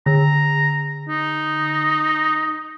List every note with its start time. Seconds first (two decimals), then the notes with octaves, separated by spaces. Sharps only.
0.06 D3 A#5
1.09 D#4